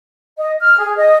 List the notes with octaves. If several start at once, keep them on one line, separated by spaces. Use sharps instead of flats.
D#5
F6
G#4
D#5